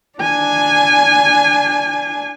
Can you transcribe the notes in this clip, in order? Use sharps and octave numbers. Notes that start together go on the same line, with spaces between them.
D4 G#5